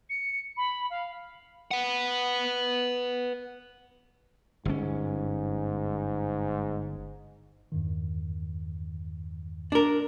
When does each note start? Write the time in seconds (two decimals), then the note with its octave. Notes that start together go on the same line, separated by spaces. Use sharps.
0.10 C#7
0.57 B5
0.90 F5
1.71 B4 F#5
4.65 G1 G#2 C#4
7.72 E2 G2 D#3
9.72 D4 A#4